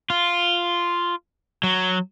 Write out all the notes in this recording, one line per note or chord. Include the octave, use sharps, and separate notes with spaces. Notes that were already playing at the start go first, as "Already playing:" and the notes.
F4
F#3